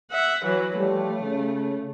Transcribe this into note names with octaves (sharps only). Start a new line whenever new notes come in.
E5 F#5
E3 F#3
F3 G3 A3 C#5
C#3